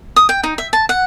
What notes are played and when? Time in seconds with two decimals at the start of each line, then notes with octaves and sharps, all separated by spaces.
0.16 D#6
0.29 G5
0.44 D#4
0.58 E5
0.73 A5
0.89 F#5